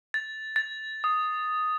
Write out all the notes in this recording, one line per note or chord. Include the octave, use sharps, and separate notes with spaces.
A6
A6
D#6